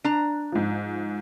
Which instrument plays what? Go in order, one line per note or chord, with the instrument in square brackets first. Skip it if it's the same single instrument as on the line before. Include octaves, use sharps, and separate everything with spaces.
[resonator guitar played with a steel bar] D4 A#5
[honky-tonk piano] G#2 F3